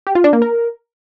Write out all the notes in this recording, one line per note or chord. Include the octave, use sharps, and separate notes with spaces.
G4
F4
D4
A#3
A#4